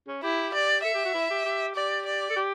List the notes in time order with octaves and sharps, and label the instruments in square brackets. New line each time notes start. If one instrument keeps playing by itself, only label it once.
[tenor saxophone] C#4
[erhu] E4 [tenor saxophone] G4
[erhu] D5
[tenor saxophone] A4 [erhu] E5
[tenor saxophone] G4
F#4
E4
G4
G4
[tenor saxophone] G4 [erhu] D5
[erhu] D5
[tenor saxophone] A4
G4